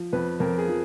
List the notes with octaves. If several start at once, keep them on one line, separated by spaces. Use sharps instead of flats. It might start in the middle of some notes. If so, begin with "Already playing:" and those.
Already playing: F3
F2 B4
F2 A#4
G#4
F3